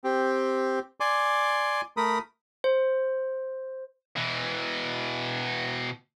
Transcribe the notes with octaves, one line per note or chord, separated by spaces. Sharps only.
C4 G4
D5 G#5 C6 D6
A3 A#4 B5 D#6
C5
B2 E3